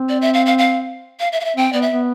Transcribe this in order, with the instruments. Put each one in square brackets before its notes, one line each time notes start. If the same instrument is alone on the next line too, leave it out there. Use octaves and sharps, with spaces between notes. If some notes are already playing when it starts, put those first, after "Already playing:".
Already playing: [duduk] C4
[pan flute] D5
E5
F5
F5
F5
F5
E5
F5
E5
[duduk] C4 [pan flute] G5
[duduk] B3 [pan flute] D5
[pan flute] E5
[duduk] B3